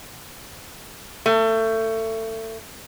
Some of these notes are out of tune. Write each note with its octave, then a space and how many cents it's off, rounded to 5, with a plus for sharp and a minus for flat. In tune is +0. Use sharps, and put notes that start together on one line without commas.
A3 +25